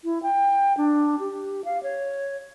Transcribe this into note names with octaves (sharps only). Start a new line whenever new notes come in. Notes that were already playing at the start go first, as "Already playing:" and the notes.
E4
G5
D4
G4
F5
C#5